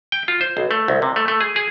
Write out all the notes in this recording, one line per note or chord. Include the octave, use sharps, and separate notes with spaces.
G5
F4
C5
B1
A3
C2
C3
A3
A3
G#4
G#4